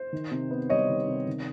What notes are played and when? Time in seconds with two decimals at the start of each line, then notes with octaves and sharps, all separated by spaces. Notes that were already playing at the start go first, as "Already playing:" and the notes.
Already playing: C5
0.13 D#3
0.31 C3
0.51 B3
0.69 G3 C#5 D#5
0.89 D#3
1.08 C3
1.27 D#3